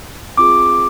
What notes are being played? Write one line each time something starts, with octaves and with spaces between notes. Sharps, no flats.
C4 F4 G#4 D6